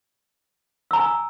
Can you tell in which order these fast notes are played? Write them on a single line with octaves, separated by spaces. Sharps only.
E6 A#5 G#5